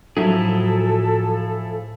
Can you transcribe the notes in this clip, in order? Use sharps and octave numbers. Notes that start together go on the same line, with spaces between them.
A2 F3 F#3 E4 G#4 A4